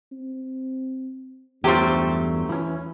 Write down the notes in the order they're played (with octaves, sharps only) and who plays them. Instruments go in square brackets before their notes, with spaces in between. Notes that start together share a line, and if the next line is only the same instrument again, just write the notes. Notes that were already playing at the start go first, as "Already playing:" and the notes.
[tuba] C4
[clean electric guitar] E2 [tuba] G2 [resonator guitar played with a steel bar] F#3 A3 C5 [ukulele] F4 G4
[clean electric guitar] E3 C#4